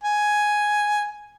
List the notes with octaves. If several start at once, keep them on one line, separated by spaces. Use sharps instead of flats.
G#5